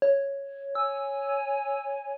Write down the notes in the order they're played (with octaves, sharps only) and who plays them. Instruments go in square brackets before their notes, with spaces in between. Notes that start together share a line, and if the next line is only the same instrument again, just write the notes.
[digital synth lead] C#5
[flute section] C#5 G#5 [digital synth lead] E6